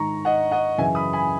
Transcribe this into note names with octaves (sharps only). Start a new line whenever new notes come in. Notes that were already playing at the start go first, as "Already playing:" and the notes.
Already playing: G#2 D#3 A#5 C#6
D#5 F#5
D#5 F#5
F#2 C#3 E3 E5 G#5
B5 D#6
G#5 B5